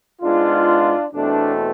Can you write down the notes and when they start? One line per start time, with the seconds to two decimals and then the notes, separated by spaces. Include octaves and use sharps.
0.22 G#2 G#3 B3 D4 F4
1.12 E2 B2 A3 C4 D4